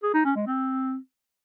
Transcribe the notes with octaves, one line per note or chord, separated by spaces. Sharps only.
G#4
D#4
C#4
G#3
C4